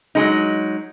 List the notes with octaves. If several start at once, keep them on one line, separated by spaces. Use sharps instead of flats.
F#3 G#3 D#4